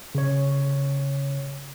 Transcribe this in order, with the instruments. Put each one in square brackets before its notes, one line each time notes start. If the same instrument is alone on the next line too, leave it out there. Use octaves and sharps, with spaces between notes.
[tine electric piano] C#3 C#5